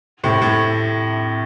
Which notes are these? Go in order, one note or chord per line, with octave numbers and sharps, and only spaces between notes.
A2 C3
A2